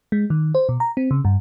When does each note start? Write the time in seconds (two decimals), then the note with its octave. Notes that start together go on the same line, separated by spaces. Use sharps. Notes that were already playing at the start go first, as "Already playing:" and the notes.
0.12 G#3
0.30 D#3
0.55 C5
0.69 B2
0.80 A#5
0.97 C4
1.11 C#3
1.25 G2